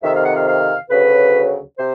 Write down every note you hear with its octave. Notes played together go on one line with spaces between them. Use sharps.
F2 C3 D#3 E5
F5
F#5
F5
F5
D2 C#3 F#3 B4
C3 C5